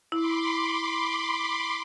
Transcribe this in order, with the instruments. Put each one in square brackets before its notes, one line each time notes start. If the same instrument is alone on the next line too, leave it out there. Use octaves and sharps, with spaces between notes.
[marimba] E4 [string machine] B5 C6 D6